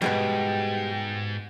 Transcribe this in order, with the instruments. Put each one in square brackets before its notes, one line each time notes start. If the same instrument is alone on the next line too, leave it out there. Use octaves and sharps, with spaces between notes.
[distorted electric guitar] G#2 [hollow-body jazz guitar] B2 G#3 B3 [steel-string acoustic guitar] G3 [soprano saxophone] G5